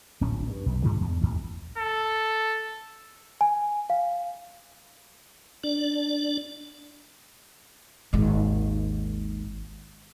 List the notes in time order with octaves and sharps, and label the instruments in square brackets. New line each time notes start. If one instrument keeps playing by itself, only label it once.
[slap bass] D1 A#1 C#4
G2
B1
G2 D3 F3 G#3
E2
A1 D#2
[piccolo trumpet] A4
[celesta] G#5
F5
[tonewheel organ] D4 D5
[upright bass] G#1 D#2